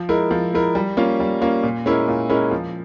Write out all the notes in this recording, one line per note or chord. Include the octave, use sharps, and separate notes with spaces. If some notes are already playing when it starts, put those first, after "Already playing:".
Already playing: F3
G#3 E4 A#4
F3
G#3 E4 A#4
G3
A#3 C#4 F4
G3
A#3 C#4 F4
A#2
G#3 C#4 E4 A#4
A#2
G#3 C#4 E4 A#4
F3